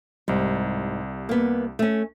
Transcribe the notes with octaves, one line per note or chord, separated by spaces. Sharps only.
C2 G#2 G3
A#3 B3
A3 C#4